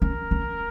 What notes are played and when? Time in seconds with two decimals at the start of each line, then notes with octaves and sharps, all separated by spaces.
0.01 C#4 A#4
0.31 C#4